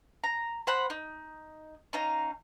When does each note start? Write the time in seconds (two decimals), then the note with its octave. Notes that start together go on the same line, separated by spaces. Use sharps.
0.24 A#5
0.67 C5 F#5 B5
0.90 D#4
1.93 C#4 D#4 F5 A#5